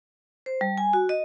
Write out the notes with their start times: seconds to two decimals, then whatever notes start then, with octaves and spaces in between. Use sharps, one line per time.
0.46 C5
0.61 G3
0.78 G#5
0.93 F#4
1.09 D#5